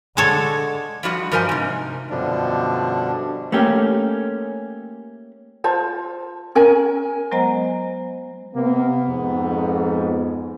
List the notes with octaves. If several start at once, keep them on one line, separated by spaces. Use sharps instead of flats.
D3 G#3 A4 C#5
F3 G3 F#4 D#5
G2 F3 A#4 C5 D#5 G#5
G#2 C3
F#2 B2 D3 F3 G3 D4
A3 A#3 C#4 G4
F4 C5 A5
C#4 A#4 G#5
F#3 G#3 B3 C5 D#5 A#5
C3 A#3 B3
F2 G#2